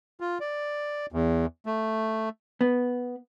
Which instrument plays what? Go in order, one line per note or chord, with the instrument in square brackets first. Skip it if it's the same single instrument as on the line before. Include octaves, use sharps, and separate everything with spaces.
[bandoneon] F4
D5
E2
A3
[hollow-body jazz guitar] B3